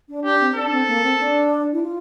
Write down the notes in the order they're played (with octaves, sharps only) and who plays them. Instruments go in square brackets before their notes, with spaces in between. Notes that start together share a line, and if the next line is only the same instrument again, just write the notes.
[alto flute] D4
[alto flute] D4 [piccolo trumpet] G4
[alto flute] C4
[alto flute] D4 [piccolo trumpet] A4
[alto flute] C4
A#3
C4
D4
E4
F4